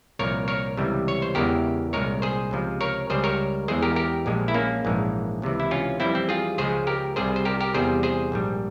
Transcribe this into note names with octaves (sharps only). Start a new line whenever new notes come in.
C2 A#2 F3 A#4 C#5
A#4 C#5
C#2 C3 E3 G3
C#5
C5
E2 C#3 E3 G#3 G4 A#4
C2 A#2 G#3 A#4 C#5
G#4 C5
C#2 C3 F3
A#4 C#5
C#2 C#3 G3 G#4 C5
A#4 C#5
E2 E3 G#3 G#4 C5
G4 A#4
G4 A#4
A#1 A#2 F3 G#3
E4
A#3 C#4
A#1 G#2 E3 G#3
C#2 C3 E3
E4
C#4 F4
F2 E3 G3 C4 E4
C4
F4 G#4
C#2 C#3 F3 G#3 G#4 C5
G4 A#4
C2 C3 G3 G#4 C5
C5
G4 A#4
G4 A#4
E2 C3 G3 G#4 C5
G#4 C5
A#1 G#2 G3